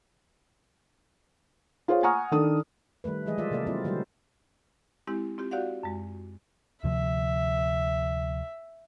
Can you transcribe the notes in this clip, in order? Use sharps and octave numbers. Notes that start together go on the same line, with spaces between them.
F4 G#4 C5 C#5 F5
F#5 G#5 A#5 C#6 D#6 F6
D#3 D4 A4 D#6
D#3 G3 A3 B4
E3 F3 G3 G#3 G#4 D#5
G3 G#3 F4 D5 E5
C3 A3 A#3 A4 D5
F#3 C4 E4 F4 D5
D3 F#3 G3 A3 C5
G#3 C4 E4 G4
C4 F4 G4
F#4 G4 D5 F5 F#5
F#2 G#3
D2 C3 F3 E5